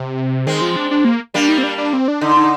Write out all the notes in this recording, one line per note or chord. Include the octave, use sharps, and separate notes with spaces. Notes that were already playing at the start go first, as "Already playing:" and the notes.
Already playing: C3
D#3 G#3 C4
F3
D4
D4
A#3
G3 A#3 D4
D#4
C4
D4
D4
C4
D4
D3 D#4
D#4